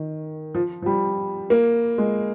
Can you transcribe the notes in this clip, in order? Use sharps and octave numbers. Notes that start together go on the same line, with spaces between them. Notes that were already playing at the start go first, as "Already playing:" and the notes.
Already playing: D#3
F3
F3
G3
A#3
G#3